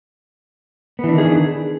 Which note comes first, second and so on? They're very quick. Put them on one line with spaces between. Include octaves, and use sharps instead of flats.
B3 E3 D4 D#3 G#4